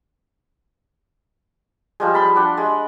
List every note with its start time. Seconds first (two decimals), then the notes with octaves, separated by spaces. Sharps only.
2.00 F3 G3 G#3
2.14 A5 B5 C6
2.36 D4 G4 F#5
2.57 G#3